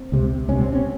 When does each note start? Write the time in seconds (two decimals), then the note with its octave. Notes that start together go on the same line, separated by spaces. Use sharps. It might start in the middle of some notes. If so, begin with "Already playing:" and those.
Already playing: C4
0.12 C#2 C3
0.48 C#2 C3 C#4
0.61 C4
0.73 C#4